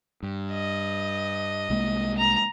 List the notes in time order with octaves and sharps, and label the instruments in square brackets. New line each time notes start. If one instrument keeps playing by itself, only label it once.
[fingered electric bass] G2
[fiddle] D#5
[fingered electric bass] C2 G#3 A#3
[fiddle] A#5